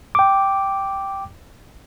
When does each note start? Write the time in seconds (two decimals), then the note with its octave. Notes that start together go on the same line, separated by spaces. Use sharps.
0.15 G5 D6